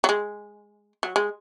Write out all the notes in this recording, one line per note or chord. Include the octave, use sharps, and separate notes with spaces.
F#3
G#3
F#3
G#3